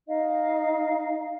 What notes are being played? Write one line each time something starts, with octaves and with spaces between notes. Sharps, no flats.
D#4 D#5 F5